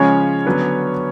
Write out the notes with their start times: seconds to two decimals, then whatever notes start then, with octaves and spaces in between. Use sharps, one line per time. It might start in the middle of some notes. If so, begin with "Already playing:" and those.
Already playing: C#3 F3 G#3 C#4 C#5
0.46 D3 F#3 B3 D4